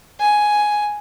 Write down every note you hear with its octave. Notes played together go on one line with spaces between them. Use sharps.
G#5